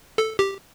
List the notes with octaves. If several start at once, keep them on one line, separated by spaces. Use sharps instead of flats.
A4
G4